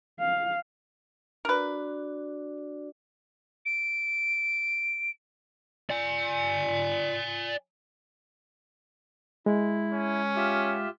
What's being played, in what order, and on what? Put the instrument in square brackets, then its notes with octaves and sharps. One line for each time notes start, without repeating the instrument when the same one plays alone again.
[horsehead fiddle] F5
[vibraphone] D4 F#4 D5 [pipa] A#4 B4
[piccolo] D7
[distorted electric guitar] D5 G#5
[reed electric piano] G#3 [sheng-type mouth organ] E4
[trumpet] C#4
[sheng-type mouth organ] F4 G4 E5